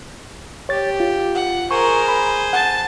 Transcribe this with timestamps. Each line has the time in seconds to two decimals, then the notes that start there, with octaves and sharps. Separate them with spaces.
0.69 G4 C#5 A6
1.00 F4
1.35 F#5
1.71 G#4 A#4 C5 G#5 C#6
2.08 B5
2.53 F#5 A5